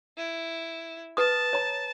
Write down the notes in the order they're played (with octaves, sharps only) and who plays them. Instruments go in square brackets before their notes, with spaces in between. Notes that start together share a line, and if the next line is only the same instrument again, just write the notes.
[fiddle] E4
[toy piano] B4 D#6 [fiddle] A5
[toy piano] C#5 A#5